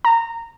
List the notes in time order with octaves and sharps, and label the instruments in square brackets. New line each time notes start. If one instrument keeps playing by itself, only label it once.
[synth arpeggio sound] A#5